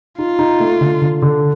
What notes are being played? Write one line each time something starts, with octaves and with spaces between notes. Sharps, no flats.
D#4 F4
D#4
A3
D3
D3
D3